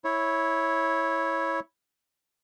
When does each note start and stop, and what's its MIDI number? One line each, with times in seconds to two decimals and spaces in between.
0.05 1.60 64
0.05 1.60 73